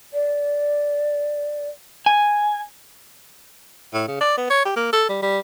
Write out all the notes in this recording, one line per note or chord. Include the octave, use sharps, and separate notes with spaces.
D5
G#5
A2
C#3
D5
B3
C#5
G4
A#3
A4
G3
G3